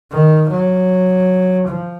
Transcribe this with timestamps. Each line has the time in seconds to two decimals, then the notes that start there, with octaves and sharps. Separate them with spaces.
0.12 D#3
0.51 F#3
1.69 F3